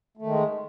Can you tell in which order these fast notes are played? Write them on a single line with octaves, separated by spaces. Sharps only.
A3 D#3 G#3